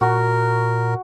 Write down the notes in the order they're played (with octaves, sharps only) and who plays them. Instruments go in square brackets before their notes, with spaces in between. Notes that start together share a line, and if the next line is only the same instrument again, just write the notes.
[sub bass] A#2 [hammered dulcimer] F#4 [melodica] A#4